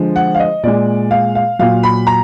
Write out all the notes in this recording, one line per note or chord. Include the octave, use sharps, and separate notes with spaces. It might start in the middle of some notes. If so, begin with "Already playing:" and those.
Already playing: D3 F3 G#3
F#5
F5
D#5
A#2 G#3 D5
F5
F5
A#2 F#3 F5
B5
A#5